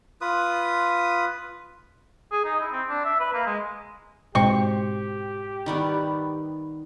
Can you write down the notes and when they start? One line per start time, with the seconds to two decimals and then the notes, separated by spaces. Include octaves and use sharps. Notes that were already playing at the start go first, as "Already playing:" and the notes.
0.21 F4 B4 D#6
2.32 G#4
2.45 D#4
2.60 E4
2.72 C4
2.89 D4
3.05 E5
3.20 B4
3.34 A#3
3.46 G#3
4.35 G#2 B2 G#3 C4 G4 C#6
5.66 D#3 G3 B3